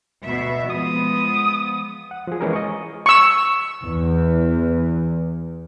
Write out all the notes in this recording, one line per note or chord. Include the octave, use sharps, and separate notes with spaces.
D2 B2 E5
F3 G#3 B3 D#6
F#5
F3 G#4
E3 G#3 C#4 G#4 A#4 B4
D#5 C#6
C#6 E6
E2